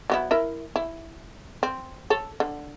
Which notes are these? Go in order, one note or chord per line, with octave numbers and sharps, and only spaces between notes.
F#3 B3 E4
E4 A#4 E5
E4
C4
A4 C#5
D3